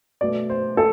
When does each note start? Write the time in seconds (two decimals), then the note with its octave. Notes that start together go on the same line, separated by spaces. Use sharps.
0.21 B2 A3 D5
0.50 C5
0.77 A4